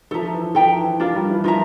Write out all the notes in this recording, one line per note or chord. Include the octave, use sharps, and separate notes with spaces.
F3 A4 E5 A#5
E3
F3 A4 E5 G5 A#5
E3
F3 D4 F4 A#4
G3
E3
F3 F4 A#4 E5 A#5